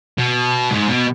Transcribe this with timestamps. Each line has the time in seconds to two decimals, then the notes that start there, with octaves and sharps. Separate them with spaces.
0.18 B2
0.70 G#2
0.88 B2